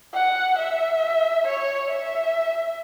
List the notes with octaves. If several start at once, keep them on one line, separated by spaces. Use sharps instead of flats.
F#5
E5
C#5
E5